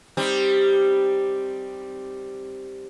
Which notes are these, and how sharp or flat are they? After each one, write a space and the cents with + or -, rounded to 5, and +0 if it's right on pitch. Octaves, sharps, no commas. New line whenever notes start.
G3 +0 C4 +0 D#4 +0